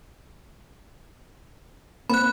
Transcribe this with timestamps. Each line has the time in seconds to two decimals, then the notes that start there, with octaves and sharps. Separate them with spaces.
2.10 A#3 C4 B5 F#6